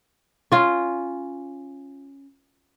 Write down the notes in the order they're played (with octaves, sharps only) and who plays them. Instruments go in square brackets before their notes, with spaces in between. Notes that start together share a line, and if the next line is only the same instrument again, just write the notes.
[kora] C#4 F4